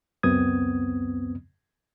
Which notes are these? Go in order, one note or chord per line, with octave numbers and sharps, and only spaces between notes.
C#2 F#2 B3 C4 D#6 G#6